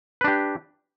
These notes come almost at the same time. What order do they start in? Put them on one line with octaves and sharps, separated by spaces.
B4 D4 G4